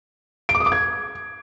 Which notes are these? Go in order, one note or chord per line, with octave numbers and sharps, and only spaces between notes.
D7
D6
D#6
D6
G#6